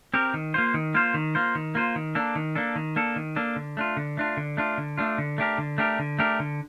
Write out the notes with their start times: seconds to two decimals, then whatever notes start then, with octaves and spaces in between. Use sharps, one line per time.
0.14 C4 G4 A#4
0.34 D#3
0.54 A#3 F4 C5
0.74 D#3
0.94 A#3 F4 C5
1.14 D#3
1.35 A#3 F4 C5
1.55 D#3
1.75 A#3 F4 C5
1.96 D#3
2.15 A#3 D4 A4
2.35 D#3
2.55 A#3 D4 A4
2.76 D#3
2.96 A#3 D4 A4
3.16 D#3
3.36 A#3 D4 A4
3.56 D3
3.77 A3 D4 F4
3.97 D3
4.17 A3 D4 F4
4.37 D3
4.57 A3 D4 F4
4.78 D3
4.98 A3 D4 F4
5.18 D3
5.38 A3 D4 G4 A#4
5.58 D3
5.78 A3 D4 G4 A#4
5.99 D3
6.19 A3 D4 G4 A#4
6.40 D3